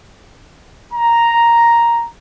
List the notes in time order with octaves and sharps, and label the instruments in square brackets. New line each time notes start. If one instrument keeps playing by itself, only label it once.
[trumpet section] A#5